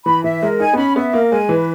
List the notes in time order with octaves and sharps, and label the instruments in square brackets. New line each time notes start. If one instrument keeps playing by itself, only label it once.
[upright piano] E3 [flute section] B5
[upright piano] E3 [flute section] E5
[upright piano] G#3 [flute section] A#4
[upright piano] D#4 [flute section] G#5
[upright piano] B3
[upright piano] C#4 [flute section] B5
[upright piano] B3 [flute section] E5
[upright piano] A#3 [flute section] A#4
[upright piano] G#3 [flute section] G#5
[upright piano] E3 [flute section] B4